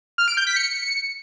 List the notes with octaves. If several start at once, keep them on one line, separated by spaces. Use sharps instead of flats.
F6
D7
G6
B6
C#7